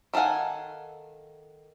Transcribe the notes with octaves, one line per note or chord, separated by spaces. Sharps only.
D#3 A4 F5 F#5 G#5